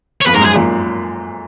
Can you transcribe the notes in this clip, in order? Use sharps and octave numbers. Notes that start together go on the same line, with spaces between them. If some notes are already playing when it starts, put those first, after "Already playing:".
C#5
F2 B4
G#2 A#4
F#2
G#4
A#2